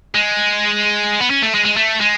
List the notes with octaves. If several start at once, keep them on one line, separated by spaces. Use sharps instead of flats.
G#3
B3
C#4
A3
G#3
G#3
A3
G#3